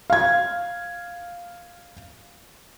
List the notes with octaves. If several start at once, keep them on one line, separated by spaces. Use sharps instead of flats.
F5 G#6